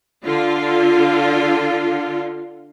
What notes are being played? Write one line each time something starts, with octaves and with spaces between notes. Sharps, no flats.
D3 F4